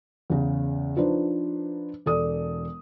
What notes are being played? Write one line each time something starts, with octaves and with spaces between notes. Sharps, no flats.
E2 C#3
F3 D4 D#4 B4 C5
E1 A4 D5 D#6